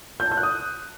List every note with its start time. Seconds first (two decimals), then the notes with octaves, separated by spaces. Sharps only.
0.20 G6
0.26 A5
0.32 G6
0.37 F#6
0.43 D#6